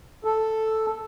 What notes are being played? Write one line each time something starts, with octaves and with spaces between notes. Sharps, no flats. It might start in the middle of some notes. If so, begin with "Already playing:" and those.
A4